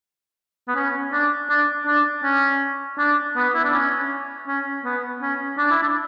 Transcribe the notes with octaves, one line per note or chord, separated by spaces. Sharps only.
B3
C#4
D4
D4
D4
C#4
D4
B3
E4
D4
C#4
C#4
B3
C#4
D4
E4
D4